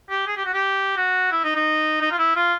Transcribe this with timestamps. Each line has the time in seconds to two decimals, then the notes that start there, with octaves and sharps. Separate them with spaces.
0.10 G4
0.27 G#4
0.37 G4
0.45 F#4
0.54 G4
0.97 F#4
1.31 E4
1.44 D#4
1.55 D#4
2.01 D#4
2.11 F4
2.19 E4
2.36 F4